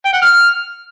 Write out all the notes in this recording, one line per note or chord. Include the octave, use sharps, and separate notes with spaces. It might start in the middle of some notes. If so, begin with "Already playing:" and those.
G5
F#5
F6